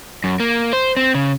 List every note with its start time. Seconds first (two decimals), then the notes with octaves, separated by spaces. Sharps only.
0.24 F#2
0.40 A#3
0.73 C5
0.97 C4
1.15 C#3